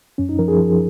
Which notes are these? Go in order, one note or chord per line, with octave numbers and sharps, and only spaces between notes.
F#2 C#4
D#4
F3 A#4
G#4
F3